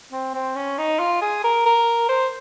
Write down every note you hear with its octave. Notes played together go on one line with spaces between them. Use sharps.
C4
C4
C#4
D#4
F4
G#4
A#4
A#4
C5